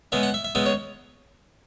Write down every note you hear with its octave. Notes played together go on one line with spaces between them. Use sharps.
C#3 G#3 B3 E5
F#5
E5
E5
C#3 G#3 B3 E5
C#5